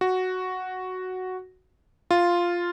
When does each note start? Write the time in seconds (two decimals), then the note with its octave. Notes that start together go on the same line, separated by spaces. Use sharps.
0.01 F#4
2.11 F4